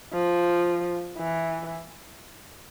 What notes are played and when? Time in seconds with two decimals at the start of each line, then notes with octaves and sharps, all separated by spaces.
0.13 F3
1.18 E3